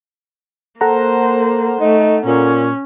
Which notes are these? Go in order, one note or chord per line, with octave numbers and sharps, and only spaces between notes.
A#3 A4 C5 F#5 A#5
A3 D#4
A#2 C#4